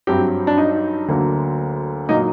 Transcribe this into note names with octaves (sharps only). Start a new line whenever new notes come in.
G2 F#3 C4 G4
D4
D#4
D2 D3 F#3 A#3
A#2 F#3 A#3 D#4